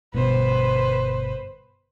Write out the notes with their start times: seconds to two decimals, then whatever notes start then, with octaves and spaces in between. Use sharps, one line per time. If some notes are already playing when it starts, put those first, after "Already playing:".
0.14 G1 B2 B4 C5